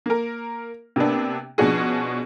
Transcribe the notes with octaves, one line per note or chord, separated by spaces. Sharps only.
A#3 A#4
C3 A#3 B3 D4
B2 F3 C#4 D4 F#4 G#4